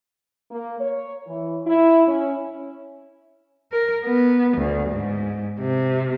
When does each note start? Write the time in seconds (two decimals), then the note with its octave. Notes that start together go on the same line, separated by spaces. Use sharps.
0.51 A#3
0.80 C#5
1.27 E3
1.66 E4
2.08 C#4
3.72 A#4
4.04 B3
4.57 D2
4.90 G#2
5.60 C3